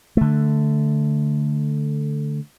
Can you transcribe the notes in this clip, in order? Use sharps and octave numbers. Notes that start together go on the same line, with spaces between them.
D3 A3